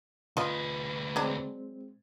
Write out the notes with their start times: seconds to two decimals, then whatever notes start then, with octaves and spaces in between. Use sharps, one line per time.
0.37 D2 F4 B4 D#5
1.16 F#3 G#3 C4 D4